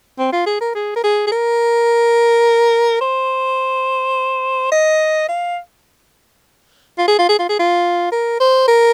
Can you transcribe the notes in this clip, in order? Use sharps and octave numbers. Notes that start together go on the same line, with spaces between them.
C4
F4
G#4
A#4
G#4
A#4
G#4
G#4
A#4
C5
D#5
F5
F4
G#4
F4
G#4
F4
G#4
F4
A#4
C5
A#4